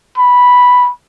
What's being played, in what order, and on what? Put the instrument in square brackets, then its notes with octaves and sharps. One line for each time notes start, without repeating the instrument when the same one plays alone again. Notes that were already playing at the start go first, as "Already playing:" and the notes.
[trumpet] B5